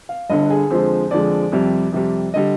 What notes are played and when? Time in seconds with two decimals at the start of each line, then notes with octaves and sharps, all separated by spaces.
0.09 F5
0.29 G1 G2 D3 D#5
0.50 G#4
0.70 F2 D3 F3 G#3 C5
1.11 F2 D3 F3 G#3 D5
1.52 F2 C3 G3
1.92 F2 C3 G3
2.34 D3 G3 D#5